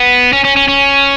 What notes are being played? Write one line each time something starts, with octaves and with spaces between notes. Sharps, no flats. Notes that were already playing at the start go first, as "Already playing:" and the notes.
Already playing: B3
C#4
C#4
C#4
C#4